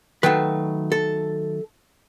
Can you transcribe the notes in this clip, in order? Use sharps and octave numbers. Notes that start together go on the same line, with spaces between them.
D#3 F#3 A3 B4
A4